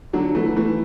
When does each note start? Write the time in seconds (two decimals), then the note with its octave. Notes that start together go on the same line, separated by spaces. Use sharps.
0.13 D3 F#3
0.35 E3 A3
0.56 E3 A3